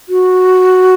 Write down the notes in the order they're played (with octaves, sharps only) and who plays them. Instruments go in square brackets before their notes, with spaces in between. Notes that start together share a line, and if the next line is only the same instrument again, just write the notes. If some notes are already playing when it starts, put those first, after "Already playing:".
[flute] F#4